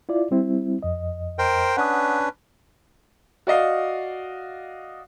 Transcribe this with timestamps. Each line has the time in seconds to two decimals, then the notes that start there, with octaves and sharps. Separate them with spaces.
0.09 E4 F4 D5
0.31 G3 C4 E4
0.83 F2 D#5
1.39 A#4 C5 G5
1.77 C#4 D4 B4 F#5 D#6
3.47 F#4 D5 D#5 F5